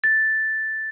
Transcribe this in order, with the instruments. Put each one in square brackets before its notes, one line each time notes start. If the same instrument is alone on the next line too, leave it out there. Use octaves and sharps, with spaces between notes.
[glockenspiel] A6